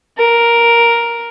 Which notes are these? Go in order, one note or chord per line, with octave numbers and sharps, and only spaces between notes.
A#4